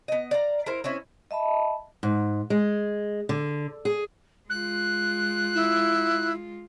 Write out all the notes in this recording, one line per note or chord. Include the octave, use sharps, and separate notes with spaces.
B3 D#5
D5 F5 A#5
E4 A#4 C5
C4 C#4 E4
D#5 E5 A5 B5
G#2
G#3
D3
G#4
G#3 F4 F#6
E4